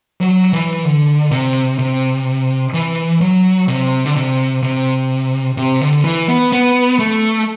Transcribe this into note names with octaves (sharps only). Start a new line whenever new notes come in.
F#3
E3
D3
C3
C3
E3
F#3
C3
D3
C3
C3
C3
D3
E3
B3
B3
A3